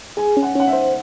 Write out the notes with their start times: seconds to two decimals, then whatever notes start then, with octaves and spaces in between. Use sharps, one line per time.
0.17 G#4 G#5
0.37 C#4
0.43 F#5
0.55 C#4 F#5
0.67 E5
0.73 C5